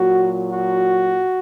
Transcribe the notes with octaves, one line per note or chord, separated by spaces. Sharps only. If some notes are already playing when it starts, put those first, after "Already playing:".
Already playing: A#2 F#3 F#4
F#4